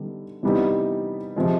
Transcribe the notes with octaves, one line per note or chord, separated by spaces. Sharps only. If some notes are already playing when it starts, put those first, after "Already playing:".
Already playing: D3 G3 B3 D#4
C3 E3 G3 B3 D#4
C3 F3 G#3